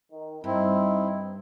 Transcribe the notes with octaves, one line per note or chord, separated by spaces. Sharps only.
D#3
G2 C4 D#4 E4